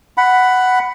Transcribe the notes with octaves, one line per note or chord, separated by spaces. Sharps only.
F#5 B5